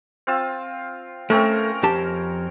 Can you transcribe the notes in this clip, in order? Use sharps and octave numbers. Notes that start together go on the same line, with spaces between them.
C4 F4 E6
A3 C4 C#4 A#4
F2 G4 A5